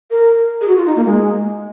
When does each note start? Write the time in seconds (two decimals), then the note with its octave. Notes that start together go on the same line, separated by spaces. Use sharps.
0.10 A#4
0.61 G#4
0.67 F#4
0.77 F4
0.86 D#4
0.96 A#3
1.05 G#3